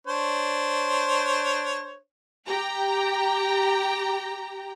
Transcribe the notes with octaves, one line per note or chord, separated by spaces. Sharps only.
D4 C5 C#5
G4 G5 A#5